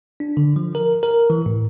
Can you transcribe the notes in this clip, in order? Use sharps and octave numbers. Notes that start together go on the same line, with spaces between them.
D4
D3
F3
A#4
A#4
E3
A2